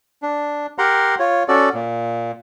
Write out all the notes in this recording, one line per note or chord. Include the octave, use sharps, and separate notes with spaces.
D4
G4 A#4 F#5 A#5 C6
F4 C#5
C#4 F#4 A4 D5
A#2